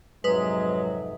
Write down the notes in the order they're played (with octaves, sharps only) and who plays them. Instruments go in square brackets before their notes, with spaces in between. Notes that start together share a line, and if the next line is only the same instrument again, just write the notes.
[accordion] F2 G#2 C3 [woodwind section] F#3 [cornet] G#3 [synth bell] B4 D#6